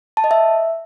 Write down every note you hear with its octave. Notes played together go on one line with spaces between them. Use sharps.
A5
D#5
E5